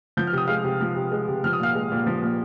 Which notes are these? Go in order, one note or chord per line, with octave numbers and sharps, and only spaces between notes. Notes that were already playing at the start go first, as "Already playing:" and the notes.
F3 G6
F6
C3 D#6
G#3 F5 F6
C3
F3
C3
G#3
C3
F3 F6
D#6
A#2 F5 F6
G#3
A#2
F3
A#2